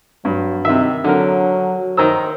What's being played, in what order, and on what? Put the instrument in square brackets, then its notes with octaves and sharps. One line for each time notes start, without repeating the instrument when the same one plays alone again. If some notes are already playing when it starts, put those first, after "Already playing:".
[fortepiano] G2 [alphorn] F#3
[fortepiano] C3 E5 [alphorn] D#3
[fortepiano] D3 A#4 [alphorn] F#3
[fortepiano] D#3 A#5 E6 [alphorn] C5